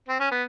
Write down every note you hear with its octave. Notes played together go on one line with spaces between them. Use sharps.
C4
C#4
B3